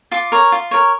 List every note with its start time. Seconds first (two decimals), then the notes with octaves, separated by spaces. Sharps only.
0.11 F4 D6
0.32 A#4 C#5
0.52 F4
0.71 A#4 C#5